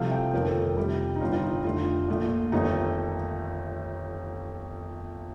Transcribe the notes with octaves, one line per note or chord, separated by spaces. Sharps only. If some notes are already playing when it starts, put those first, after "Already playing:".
Already playing: C2 C3 F3 A3 F5
G5
G1 F2 D#3 A3 A#4
A4
A#4
A4
F2 C3 G3 G4
D#4
G1 G2 D#3 G3 F4
F4
D#4
F1 F2 D3 A3 F4
A#1 A#2 A3
G1 F2 D#3 A3 D#4